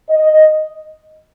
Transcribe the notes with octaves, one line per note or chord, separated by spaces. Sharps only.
D#5